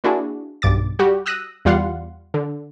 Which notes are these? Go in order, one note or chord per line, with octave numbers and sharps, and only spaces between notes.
A#3 D4 E4 F#4 G#4
B1 G2 D6 A6
G3 F#4 G4
D#6 E6 F#6 A#6 D#7
E2 G3 F4 F5 F#5 C6
D3